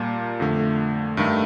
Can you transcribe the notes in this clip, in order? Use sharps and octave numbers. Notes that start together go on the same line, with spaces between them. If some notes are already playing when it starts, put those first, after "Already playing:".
Already playing: A#2 G3 A#3 A5
F2 D3 A3
G2 D#3 A3